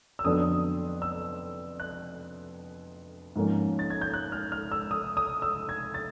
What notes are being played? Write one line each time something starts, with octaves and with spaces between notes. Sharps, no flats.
E6
F2 D3 F#3 B3 D4 D#6
E6
F#6
G#2 F3 A#3 C#4
A6
G#6
G6
F#6
F6
F6
E6
D#6
D#6
E6
G#6
A6